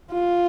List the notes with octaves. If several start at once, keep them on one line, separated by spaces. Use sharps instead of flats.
F4